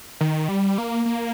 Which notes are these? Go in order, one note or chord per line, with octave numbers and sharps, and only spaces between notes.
D#3
G3
A#3
A#3